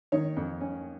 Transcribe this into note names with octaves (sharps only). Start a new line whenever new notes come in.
D#3 C#5
F2
C#4